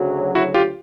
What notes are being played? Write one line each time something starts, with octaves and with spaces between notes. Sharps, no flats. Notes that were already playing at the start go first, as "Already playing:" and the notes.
Already playing: D2 C#3 F#3
E4 F#4
F4 G4